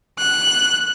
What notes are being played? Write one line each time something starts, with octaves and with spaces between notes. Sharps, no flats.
F#6